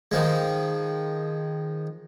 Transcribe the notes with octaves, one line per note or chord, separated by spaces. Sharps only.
D#3 F3 G#3